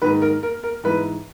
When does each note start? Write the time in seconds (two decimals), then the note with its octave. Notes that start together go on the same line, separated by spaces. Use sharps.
0.02 G#2 D#3 B4
0.22 A#4
0.43 A#4
0.63 A#4
0.84 G#2 E3 B4